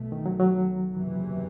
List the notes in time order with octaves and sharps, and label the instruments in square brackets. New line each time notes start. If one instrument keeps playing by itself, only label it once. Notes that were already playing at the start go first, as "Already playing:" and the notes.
Already playing: [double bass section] B1 B2 A3
[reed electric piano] D#3
F#3
F#3
[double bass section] F#1 E2 C3 E3